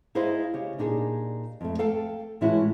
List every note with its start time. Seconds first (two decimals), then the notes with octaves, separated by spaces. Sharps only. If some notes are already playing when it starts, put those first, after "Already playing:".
0.15 D#4 E4 G#4 C5 D#5 F5
0.53 C#3 G4
0.78 A#2 D4 D#4 G4 G#4
1.61 F2 A3
1.79 A4 F5 G5 A5
2.41 A2 E3 G#3 C#4 E4 F#4